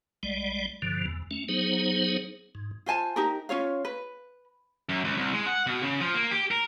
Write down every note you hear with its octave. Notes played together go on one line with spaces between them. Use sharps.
B1 G3 G#3 D5
G2 B2 D3 F3
E2
A3 C#4
F#3 B3 D#4 G#4 C5
G#2
F4 C5 G#5 A5
D#4 G4 A#4
C#4 F4 C#5 F5
B4
F#2
C#2
C2
G#3
F#5
B2
C#3
F3
A#3
G4
A#4